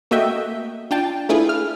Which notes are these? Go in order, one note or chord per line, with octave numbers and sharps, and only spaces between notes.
A3 A#3 F#4 D#5 E5 G5
D4 F4 G5 A5
A3 D4 E4 F4 G#4 B4
F6